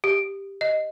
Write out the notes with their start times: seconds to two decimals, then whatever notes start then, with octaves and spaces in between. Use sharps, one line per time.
0.04 G4
0.61 D#5